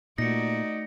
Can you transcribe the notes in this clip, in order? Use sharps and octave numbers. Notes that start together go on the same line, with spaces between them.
A#2 A3 D#4 F#4 D5 A#6 C#7